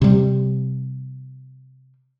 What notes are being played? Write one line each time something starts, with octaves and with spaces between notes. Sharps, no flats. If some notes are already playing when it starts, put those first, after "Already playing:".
C3 G3